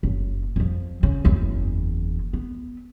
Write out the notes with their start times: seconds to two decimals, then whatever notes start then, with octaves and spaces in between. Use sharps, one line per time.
0.03 F#1
0.56 F2 F3
1.03 C#3
1.25 F#1 E2
2.33 B3